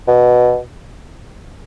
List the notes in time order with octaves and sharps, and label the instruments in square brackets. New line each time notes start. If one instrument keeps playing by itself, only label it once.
[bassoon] B2